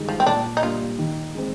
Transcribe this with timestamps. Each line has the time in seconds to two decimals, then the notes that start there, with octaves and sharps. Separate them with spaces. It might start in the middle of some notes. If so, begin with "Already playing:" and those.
Already playing: G2 D#3 G#3 D#4
0.09 F3
0.20 C4
0.27 A#2 D4
0.57 D#4
0.62 G3 A#3 D4 F4
0.99 D#3
1.35 G#3 C4